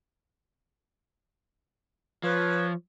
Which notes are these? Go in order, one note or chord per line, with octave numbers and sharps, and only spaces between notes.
F3 B4 C#5